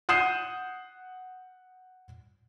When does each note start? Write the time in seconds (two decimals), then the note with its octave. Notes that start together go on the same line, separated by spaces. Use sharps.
0.09 F#5 D#6 G6 C7 E7